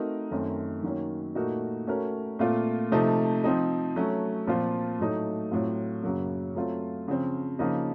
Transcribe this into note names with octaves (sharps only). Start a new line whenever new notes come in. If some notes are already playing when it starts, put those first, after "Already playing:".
Already playing: A3 C4 D#4 F#4 A#4
F#2 D#3 A3 C4
D#3 F#3 A#3 C#4
A#2 A3 D#4 F#4 A#4
A3 C#4 F#4 A#4
A#2 A3 C4 F4
C3 F3 A3 D#4
F3 C4 D#4
F#3 A3 C#4
A#2 F3 C4 F4 C5
A2 F#3 A3 D#4
A2 F#3 C4 F4
F#2 C#3 F#3 A#3
F#3 A3 C4 F4
C#3 F3 C4
C#3 F3 A#3 D#4